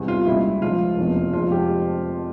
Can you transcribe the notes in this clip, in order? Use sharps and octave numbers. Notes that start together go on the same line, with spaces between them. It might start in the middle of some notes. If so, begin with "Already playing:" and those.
Already playing: E2 C3 G3
F4
C#2 C#3 G3 A#3 E4
C#2 C#3 F3 G#3 F4
F1 E2 C3 F3 A#3
F2 C3 F3 G#3 F4
G4